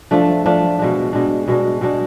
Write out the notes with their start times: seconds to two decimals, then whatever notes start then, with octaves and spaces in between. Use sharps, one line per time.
0.11 F3 A3 D4
0.46 F3 A3 D4
0.79 B2 G#3 D4
1.13 B2 G#3 D4
1.48 B2 G#3 D4
1.81 B2 G#3 D4